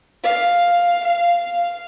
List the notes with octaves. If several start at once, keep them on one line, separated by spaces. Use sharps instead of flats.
F5
F5